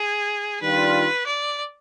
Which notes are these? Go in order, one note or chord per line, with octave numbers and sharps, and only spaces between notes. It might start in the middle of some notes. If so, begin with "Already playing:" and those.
Already playing: G#4
D#3 G3 D4 F4 B4
D5